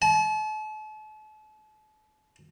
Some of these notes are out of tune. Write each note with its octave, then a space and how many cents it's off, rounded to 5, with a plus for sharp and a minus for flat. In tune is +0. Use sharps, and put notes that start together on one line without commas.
A5 -40